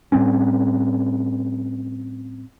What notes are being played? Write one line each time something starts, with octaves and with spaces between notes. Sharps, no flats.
A2 G3 C4 C#4